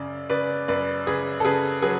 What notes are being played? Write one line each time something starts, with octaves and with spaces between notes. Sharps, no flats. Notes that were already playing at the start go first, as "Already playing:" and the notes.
Already playing: F#2 C#3 D5
C#3 B4 D5
F#2 B4 D5
C#3 G#4 B4
A4
C#3 G#4 B4
F#3 G#4 B4